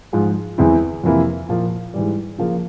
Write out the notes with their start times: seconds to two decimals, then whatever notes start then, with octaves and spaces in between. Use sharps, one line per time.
0.13 G#2 F3 G#3
0.58 E2 E3 G#3 C4 E4
1.04 F2 C3 E3 A#3 E4
1.49 A#2 F3 A#3
1.94 G#2 E3 G3
2.39 C#3 F3 A#3